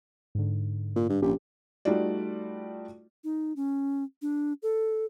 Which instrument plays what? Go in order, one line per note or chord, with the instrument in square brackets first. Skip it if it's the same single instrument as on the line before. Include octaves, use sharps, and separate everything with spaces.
[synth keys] G#2 D3
[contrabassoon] A#2
G2
[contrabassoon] A#1 [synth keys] C#4 G4
[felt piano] G3 A3 D#4 F4 F#4 D5
[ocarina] D#4
C#4
D4
A4